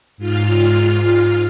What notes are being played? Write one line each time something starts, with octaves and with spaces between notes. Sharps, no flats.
G#2 F4 F6